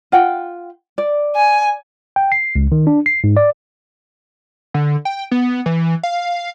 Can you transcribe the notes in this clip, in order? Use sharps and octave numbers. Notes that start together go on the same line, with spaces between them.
F4 F#5 G5
D5
G#5
G5
C7
C#2
D#3
D4
C7
G#2
D5
D3
G5
B3
E3
F5